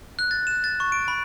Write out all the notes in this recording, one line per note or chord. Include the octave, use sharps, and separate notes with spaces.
F#6
A6
E7
A6
C#6
D7
B5